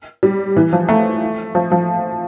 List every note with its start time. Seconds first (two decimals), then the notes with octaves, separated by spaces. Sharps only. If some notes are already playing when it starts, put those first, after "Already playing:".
0.23 G3
0.56 E3
0.73 F3
0.89 A3
1.55 F3
1.71 F3